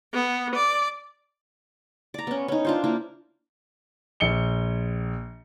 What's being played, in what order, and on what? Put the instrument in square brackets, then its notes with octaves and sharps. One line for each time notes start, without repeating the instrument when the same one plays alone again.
[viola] B3
D5
[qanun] D5 A#5
B3 C#4
C#4 D#4
D4 F4 C5
A#3 E4 F4
[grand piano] A#1 C#7 G7